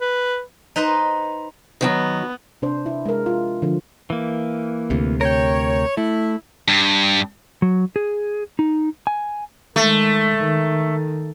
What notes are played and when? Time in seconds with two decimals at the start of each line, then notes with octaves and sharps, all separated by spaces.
0.01 B4
0.76 D#4 B4 C5 D#5
1.81 D#3 F3 F#3 B3
2.62 C3 D4 C5
2.86 E4
3.06 G#3 A#4
3.26 F4
3.62 D3 F3
4.10 E3 A#3
4.90 D2 C3
5.21 A#4 C#5 G5
5.97 A3 E4
6.68 G2
7.62 F#3
7.96 G#4
8.59 D#4
9.07 G#5
9.76 D#3 G#3 A3
10.36 D#3